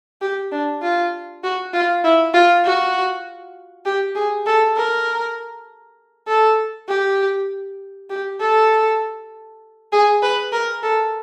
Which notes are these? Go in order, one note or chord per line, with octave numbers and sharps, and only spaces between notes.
G4
D4
F4
F#4
F4
E4
F4
F#4
G4
G#4
A4
A#4
A4
G4
G4
A4
G#4
B4
A#4
A4